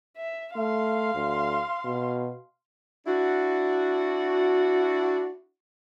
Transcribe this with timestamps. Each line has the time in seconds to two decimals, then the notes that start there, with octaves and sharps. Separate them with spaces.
0.17 E5
0.56 A3 F5 C6
1.15 D2
1.85 B2
3.07 D4 E4 F#4